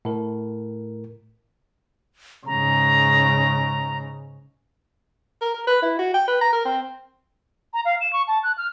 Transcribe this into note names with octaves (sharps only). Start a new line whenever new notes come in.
A2 A#4
G#2 C#3 A#5
A#4
A#4
B4
E4
F#4
G5
B4
A#5
A#4
C4
A#5
F5
E7
C#6
A5
F#6
F6